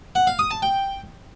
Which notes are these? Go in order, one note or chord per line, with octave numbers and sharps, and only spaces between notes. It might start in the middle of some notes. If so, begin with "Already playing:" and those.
F#5
F5
D#6
A5
G5